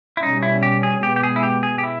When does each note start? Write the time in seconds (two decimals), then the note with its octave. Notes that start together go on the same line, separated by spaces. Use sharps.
0.17 E4
0.22 B2 G3 C#4 D#4
0.43 E4
0.63 G4
0.83 G#4
1.03 B2 G#3 B3 G4
1.16 G4
1.23 G#4
1.36 E4
1.43 G4
1.63 G#4
1.78 G4
1.84 E4